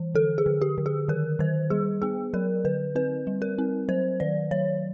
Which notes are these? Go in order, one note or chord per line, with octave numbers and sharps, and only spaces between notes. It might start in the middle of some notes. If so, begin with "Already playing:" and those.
Already playing: E3
D3 A4
G#4
D3
G4
D3
G#4
D#3 A#4
D#3 C5
G3 G#4
B3 G#4
F#3 A#4
D3 B4
C4 B4
G3
A#4
C4
F#3 C5
D#3 D5
F#3 C#5